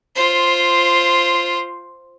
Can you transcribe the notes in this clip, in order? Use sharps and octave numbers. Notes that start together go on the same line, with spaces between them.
F4 C5